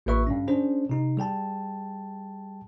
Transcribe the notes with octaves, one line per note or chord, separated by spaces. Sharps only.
A1 A#3 F4 B4 E5 C#6
G2 D3 C#4
C#4 D4 G#4 C5
C3 D#4
G3 G#4 G5 A5